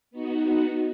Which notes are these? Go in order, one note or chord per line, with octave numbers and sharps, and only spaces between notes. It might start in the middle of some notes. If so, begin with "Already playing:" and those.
B3 D#4 F#4